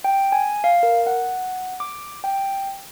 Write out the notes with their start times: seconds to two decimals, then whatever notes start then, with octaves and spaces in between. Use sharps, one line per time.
0.04 G5
0.32 G#5
0.64 F5
0.83 A#4
1.07 F#5
1.80 D6
2.24 G5